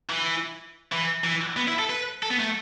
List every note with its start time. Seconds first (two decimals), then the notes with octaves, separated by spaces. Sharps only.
0.10 E3
0.92 E3
1.24 E3
1.57 B3
1.68 E4
1.79 A4
1.90 B4
2.23 A4
2.30 B3
2.39 A3